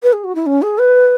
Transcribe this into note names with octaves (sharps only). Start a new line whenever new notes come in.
B4
G#4
F#4
E4
C#4
G#4
B4